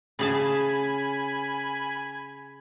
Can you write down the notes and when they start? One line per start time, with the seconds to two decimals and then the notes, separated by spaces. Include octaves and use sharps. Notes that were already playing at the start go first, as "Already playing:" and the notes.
0.19 C#3 G#4 G#5 A5 B5